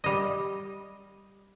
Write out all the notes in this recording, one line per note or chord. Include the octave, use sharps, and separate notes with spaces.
G3 D#5